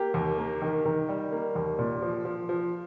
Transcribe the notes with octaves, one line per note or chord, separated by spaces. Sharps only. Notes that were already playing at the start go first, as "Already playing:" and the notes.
Already playing: A#3 G4
D#2
A#3
D#3
D#3
G3
A#3
D#2
A#2
F3
F3
F3